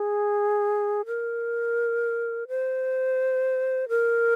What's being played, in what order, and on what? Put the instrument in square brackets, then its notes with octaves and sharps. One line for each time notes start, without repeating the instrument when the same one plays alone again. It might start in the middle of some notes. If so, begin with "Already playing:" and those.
Already playing: [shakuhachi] G#4
A#4
C5
A#4